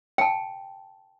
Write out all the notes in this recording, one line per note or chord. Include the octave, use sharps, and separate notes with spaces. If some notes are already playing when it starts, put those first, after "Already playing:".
G5 A5